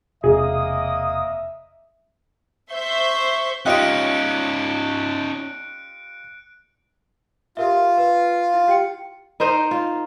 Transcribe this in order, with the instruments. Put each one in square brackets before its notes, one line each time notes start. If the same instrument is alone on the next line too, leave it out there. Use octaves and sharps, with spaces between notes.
[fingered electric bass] E1 C3 [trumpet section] A#3 D#5 D#6 [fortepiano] G#4 [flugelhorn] E5
[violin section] C5 E5 C6 C#6 G6
[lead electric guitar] C#4 D#4 [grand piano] F4 G4 D#5 [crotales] F#6 C#7 D7
[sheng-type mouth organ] F4 [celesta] G4 A#4 E5
[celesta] B4
E4
G4 G5 C#7
[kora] D#4 A#4 C5 D#5
F4